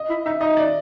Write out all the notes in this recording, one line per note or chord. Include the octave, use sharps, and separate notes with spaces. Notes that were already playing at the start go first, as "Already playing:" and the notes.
Already playing: D#5
E4
D#4 E5
D#4 D#5
D5